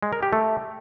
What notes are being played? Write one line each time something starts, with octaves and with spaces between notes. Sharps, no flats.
G#3
A#4
G4
A3